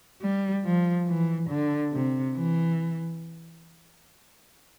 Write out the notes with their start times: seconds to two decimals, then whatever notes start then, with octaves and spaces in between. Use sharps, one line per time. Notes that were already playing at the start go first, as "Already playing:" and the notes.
0.22 G3
0.65 F3
1.08 E3
1.50 D3
1.93 C3
2.36 E3